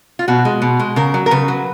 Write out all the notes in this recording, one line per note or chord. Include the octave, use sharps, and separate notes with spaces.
F4
B2 F#4
G#3
B2
G#3
C#3 A#4
F#3
A#4
C#3 B4
F#3